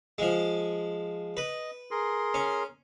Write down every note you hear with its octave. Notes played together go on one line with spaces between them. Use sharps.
F3 G#3
B4 D#5
G#4 A#4 C6
C#4